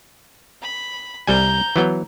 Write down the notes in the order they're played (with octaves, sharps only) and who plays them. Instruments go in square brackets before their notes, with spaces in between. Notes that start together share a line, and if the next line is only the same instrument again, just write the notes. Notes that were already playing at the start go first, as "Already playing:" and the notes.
[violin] B5
[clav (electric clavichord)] C2 G3 G#5 [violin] A#5 G6
[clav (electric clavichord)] E3 F#3 B3